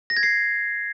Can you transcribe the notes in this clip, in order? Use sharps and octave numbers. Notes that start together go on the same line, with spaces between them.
A#6
G#6
C7